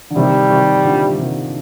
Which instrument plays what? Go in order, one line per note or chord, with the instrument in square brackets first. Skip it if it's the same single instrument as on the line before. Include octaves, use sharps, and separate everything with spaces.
[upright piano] D3
[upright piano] C3 D#3 [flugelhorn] G3
[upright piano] C3 D#3
A#2 D3
C3 D#3